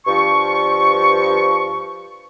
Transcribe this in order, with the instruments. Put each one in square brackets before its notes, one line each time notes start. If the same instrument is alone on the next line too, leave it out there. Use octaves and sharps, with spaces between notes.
[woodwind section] G2 F3 C#6